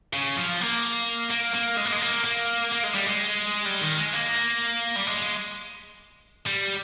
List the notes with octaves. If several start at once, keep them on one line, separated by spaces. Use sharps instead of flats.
C#3
F3
A#3
A#3
A#3
G#3
A#3
G#3
A#3
A#3
A#3
G#3
G3
G#3
G3
D#3
G#3
A#3
G3
G#3
G3